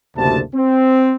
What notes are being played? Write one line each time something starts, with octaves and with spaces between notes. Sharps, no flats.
F#1 D2 C3 A5
C4